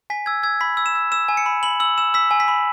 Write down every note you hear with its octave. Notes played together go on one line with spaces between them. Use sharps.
G#5 B6
E6 G#6
E6 G#6
B5 B6
E6
E7
E6
E6 E7
G#5
C#7
B5
B5 F#7
E6 F#7
E6 E7
E6 B6
G#5
B6
B5